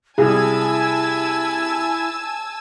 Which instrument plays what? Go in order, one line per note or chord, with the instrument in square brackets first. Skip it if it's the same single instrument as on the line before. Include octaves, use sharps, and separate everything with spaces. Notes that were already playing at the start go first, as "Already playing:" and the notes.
[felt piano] C2 G3 [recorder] E4 [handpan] G#4 [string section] G#5 A5 E6